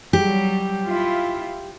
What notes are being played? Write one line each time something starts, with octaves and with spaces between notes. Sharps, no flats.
F#3 G3 G4
E4 F4